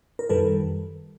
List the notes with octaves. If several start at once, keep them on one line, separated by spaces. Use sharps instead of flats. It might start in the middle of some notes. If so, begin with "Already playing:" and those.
A#4
F#2 D#3 G3 A4 B4